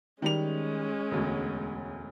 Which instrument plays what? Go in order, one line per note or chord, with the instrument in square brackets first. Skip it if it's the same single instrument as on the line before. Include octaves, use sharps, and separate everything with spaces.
[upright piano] D#3 G3 F7 [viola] G#3 C#4
[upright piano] E1 D2